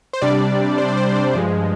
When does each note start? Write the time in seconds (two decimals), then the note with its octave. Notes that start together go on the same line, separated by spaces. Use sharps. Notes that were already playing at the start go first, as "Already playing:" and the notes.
0.13 C5
0.22 C3 G3 D4 D5
0.78 C5
0.88 D5
0.97 C5
1.16 D5
1.34 G2 F3 G#3